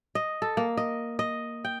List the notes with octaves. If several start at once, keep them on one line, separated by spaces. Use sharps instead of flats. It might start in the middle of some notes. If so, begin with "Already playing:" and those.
D#5
A4
A#3
D#5
D#5
G5